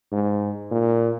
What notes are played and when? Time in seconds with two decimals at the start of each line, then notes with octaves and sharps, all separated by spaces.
0.12 G#2
0.71 A#2